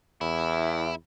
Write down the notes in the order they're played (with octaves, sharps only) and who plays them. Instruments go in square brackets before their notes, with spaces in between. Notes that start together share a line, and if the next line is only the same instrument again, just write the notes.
[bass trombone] E2 [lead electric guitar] E4